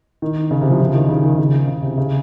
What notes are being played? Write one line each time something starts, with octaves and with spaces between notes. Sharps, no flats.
D#3
C#3
C3
F3
F3
C#3
D#3
C#3
D#3
C#3
C#3
C3
C#3